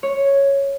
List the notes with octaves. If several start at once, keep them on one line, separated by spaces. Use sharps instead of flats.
C#5